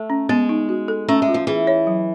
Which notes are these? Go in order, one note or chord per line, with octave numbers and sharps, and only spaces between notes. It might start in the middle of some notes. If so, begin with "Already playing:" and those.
Already playing: A3 A4
C#4
G#3 B3
D#4
F#4
A4
A3 C#4
G#3
F4
F3
E3 G#4
C#5
F#3